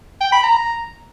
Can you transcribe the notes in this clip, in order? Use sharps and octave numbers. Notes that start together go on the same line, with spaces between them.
G5
B5
A#5